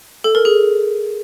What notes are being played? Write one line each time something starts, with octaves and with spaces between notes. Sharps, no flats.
A4
A#4
G#4